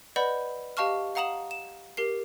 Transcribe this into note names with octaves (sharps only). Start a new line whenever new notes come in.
B4 D5 D#5 F#5 B5 G6
G4 D#5 F5 A5 C#6 F6
F5 F#5 A#5 D#6 E7 F#7
E7
G4 A#4 C7